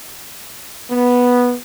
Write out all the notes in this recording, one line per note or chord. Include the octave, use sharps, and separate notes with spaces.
B3